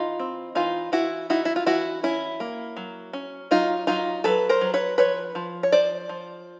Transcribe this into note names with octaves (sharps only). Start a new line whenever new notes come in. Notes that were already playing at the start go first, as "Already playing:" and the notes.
Already playing: E3 D#4 F4
C4
E3 D#4 F4
E3 E4 F#4
D#4 E4 F#4
E4
F4
E3 E4 F#4
C#4 E4
A#3
F#3
C#4
F#3 D#4 F4
F#3 D#4 F4
F#3 A4 B4
A#4 C5
F#3
B4 C#5
F3 B4 C#5
F3
C#5
F3 C5 D5
F3